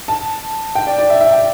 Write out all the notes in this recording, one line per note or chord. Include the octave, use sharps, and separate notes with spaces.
A5
G5
D5
D5
E5
E5
G5